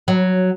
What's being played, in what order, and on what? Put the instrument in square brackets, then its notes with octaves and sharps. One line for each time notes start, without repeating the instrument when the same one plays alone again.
[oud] F#3